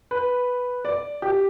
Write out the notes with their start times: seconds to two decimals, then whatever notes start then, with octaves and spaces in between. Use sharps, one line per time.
0.11 B4
0.85 D5
1.22 G4